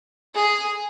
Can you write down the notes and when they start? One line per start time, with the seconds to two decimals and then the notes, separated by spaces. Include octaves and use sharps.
0.35 G#4